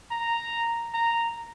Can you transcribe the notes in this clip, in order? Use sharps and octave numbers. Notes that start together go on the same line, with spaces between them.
A#5
A#5